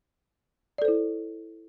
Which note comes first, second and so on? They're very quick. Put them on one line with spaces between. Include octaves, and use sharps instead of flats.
D5 A4 C5 E4